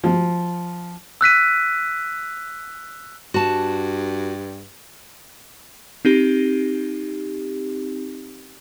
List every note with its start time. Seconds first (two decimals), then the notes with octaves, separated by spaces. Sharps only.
0.04 F3
1.21 E6 F#6 B6 D#7
3.34 G2 F#4 A5
6.05 C4 D#4 G4